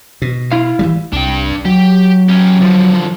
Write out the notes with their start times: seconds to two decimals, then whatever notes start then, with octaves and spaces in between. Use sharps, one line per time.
0.22 B2
0.52 E4 F5
0.79 E3 F3 G3
1.13 C2 D4 G5
1.65 F#3 G4
2.29 C#4 G4
2.61 D3 F3